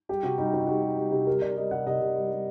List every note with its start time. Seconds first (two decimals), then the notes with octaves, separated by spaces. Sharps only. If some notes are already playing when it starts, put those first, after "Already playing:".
0.09 G3 G4
0.23 C3 F#4
0.38 G3 D#4
0.53 C3 F#4
0.61 D#4
0.67 G3 F#4
0.83 G3
0.98 G3
1.12 C3
1.27 G3 A#4
1.42 C3 D5
1.57 G3 D#5
1.71 C3 F#5
1.87 C3 D#5
2.01 C3
2.16 G3
2.31 G3